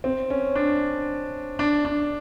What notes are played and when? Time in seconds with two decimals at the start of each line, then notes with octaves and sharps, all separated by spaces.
0.04 C4
0.30 C#4
0.55 D4
1.59 D4
1.85 D4